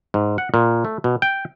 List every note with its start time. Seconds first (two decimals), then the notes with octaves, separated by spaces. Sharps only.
0.14 G#2
0.38 F#5
0.54 A#2
0.85 A3
1.04 B2
1.22 G5